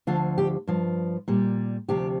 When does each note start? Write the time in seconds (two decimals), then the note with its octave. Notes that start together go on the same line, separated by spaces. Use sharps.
0.07 D2 D3 F3 F4
0.38 G4
0.67 G2 F3
1.28 A#2 G3
1.88 D2 C3 F3 G4